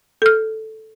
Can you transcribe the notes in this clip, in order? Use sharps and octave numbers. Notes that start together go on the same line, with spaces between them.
A4 F6